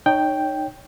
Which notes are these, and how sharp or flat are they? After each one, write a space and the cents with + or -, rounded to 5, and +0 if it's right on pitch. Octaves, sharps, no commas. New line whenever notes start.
D#4 -25 C#5 +0 G5 +0